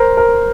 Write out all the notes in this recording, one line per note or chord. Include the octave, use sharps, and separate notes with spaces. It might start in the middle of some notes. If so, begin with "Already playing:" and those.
Already playing: A#4 C5
A#4